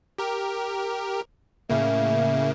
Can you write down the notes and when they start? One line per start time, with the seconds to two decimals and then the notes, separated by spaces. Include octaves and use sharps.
0.18 G4 A#4
1.69 A2 C#3 A#3 E5